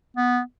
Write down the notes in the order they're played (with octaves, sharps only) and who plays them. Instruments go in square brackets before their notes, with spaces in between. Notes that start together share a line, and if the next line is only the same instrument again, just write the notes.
[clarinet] B3